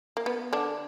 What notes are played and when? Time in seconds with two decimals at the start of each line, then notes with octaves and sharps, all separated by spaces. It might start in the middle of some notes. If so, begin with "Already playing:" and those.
0.17 A#3
0.26 B3
0.53 D3 D4